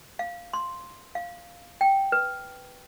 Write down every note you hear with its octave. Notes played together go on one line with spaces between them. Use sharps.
F5
C6
F5
G5
B4